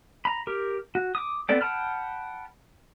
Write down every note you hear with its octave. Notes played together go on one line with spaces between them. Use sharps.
A#5 B5
G4 A#4
F#4
D6 D#6
B3 C4 A4 D5 G5
F#5 G5 A5 B5 F6